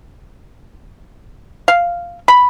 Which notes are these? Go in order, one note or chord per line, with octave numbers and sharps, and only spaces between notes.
F5
B5